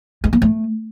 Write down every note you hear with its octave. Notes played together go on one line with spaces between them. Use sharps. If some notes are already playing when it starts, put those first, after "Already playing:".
G#3
A#3
A3